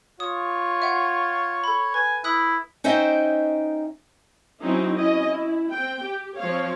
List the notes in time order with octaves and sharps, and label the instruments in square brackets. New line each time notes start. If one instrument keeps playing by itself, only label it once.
[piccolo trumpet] F4 [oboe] C#5 [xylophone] D#6
[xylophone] E5 F#5
A4 B5
[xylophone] B4 [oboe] G#5
[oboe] E4 [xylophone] B5 D#6 F#6
[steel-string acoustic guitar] C#4 D#4 C5 D#5 E5 G5
[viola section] F#3 C4 C#4 D#4 E4
C#4 E4 D#5
E4
C4 G5
G4
F3 C4 C#5 F5